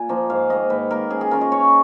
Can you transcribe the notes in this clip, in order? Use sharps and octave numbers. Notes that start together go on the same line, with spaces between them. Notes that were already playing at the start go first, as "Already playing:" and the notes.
Already playing: A#2 G#5
F3 A#3 D#4
G#2 F5
D#3 A#3 D#5
G#2 B4
D#3 A#3 A#4
C#3 G#4
G#4
G#3 C#4 F4 A#4
D#5
C#3 C#5